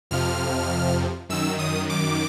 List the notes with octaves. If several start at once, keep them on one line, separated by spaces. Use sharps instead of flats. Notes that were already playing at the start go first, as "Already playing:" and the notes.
F2 C3 F3 F6
F#2 D#3 E6
D#6
D6